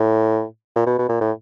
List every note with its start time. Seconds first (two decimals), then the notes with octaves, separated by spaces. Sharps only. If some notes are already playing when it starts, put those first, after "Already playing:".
Already playing: A2
0.76 A#2
0.86 B2
0.99 B2
1.09 A#2
1.21 A2